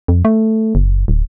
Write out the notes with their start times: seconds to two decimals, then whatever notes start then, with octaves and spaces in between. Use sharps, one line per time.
0.08 F2
0.25 A3
0.75 F#1
1.08 D1